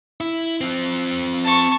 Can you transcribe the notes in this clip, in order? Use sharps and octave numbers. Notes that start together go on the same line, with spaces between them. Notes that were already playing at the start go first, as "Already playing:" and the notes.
E4
F3 C4
A5 C#6